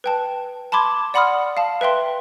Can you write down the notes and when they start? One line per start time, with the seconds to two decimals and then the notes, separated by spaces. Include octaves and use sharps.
0.04 B4 G5 A5
0.72 A5 B5 C6 D6 G#6
1.14 D5 F#5 B5 C6 D#6 F6
1.57 F5 A5
1.81 B4 E5 G5 C6